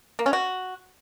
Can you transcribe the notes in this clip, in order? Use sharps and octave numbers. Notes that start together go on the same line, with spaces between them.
A#3
C#4
F#4